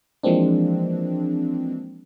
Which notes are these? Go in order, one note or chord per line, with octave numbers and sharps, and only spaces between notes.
E3 F3 G#3 A#3 C4 D4